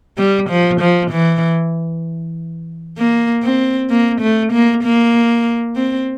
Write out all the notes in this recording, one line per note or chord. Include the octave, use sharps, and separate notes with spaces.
G3
F3
F3
E3
A#3
C4
A#3
A3
A#3
A#3
C4